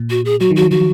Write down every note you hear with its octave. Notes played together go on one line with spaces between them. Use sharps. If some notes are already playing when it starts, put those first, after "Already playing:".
Already playing: A#2
F#4
G#4
F#3 F#4
D#3
F#4
F3
D#3 F#4